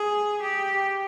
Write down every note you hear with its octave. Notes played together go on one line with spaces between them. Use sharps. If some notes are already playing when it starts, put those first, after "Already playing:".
Already playing: G#4
G4